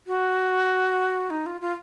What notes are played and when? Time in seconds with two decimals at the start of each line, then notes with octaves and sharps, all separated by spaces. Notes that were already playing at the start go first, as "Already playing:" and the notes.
0.07 F#4
1.30 D#4
1.46 F4
1.61 F4